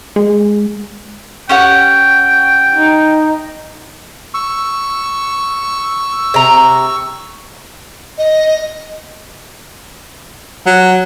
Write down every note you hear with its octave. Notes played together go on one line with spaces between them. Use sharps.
G#3
C#4 G4 F#5 G5
D#4
C#6 E6
C3 A#5
D#5
F#3